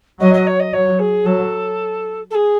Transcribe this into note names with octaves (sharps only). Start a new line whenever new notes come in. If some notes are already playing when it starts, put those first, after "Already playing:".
F#3 D#5
D#5
C#5
D#5
F#3 C#5
G#4
F#3 A4
A4
G#4